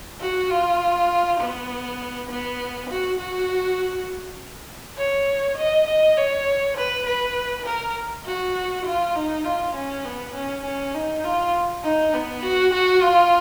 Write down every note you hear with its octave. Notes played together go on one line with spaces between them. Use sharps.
F#4
F4
B3
B3
F#4
F#4
C#5
D#5
D#5
C#5
B4
B4
A#4
F#4
F4
D#4
F4
C#4
B3
C#4
C#4
D#4
F4
D#4
B3
F#4
F#4
F4